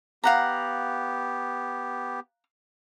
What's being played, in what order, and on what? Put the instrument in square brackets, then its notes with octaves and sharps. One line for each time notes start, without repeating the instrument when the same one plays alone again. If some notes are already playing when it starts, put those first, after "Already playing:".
[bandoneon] B3 G4 [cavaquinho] F5 F#5 A#5